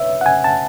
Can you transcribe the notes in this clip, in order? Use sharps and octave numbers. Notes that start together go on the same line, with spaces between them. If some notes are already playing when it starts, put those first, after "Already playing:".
Already playing: B4 C#5 E5
F#5
G#5
A5